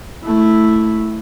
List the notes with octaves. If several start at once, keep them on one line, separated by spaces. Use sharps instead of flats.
A3 E4